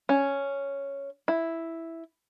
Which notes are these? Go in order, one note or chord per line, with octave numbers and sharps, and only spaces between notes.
C#4
E4